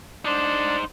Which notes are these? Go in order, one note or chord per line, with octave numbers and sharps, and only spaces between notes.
D4 D#4 C5